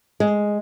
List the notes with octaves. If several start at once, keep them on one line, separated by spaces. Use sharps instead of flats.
G#3